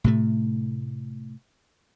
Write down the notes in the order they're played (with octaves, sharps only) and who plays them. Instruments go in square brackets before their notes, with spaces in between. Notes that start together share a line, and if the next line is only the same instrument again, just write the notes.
[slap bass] A2 C3 A3